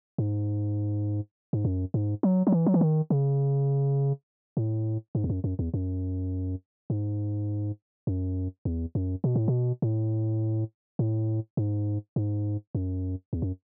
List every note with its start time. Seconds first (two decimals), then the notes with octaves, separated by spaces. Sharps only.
0.18 G#2
1.53 G#2
1.65 F#2
1.94 G#2
2.23 F#3
2.47 F#3
2.52 E3
2.66 F#3
2.74 E3
2.81 D#3
3.10 C#3
4.57 A2
5.15 G#2
5.24 E2
5.30 F#2
5.44 F#2
5.59 E2
5.74 F#2
6.90 G#2
8.07 F#2
8.65 E2
8.95 F#2
9.24 B2
9.36 A2
9.48 B2
9.82 A2
10.99 A2
11.57 G#2
12.16 G#2
12.75 F#2
13.33 E2
13.42 F#2